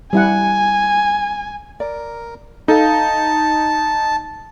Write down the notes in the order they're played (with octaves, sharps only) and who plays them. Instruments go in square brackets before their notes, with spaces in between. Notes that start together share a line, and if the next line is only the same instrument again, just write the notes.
[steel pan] G3 E4 F#5 [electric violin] G#5
[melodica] A#4 [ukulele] D5
[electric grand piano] D#4 [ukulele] A4 F5 [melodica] A5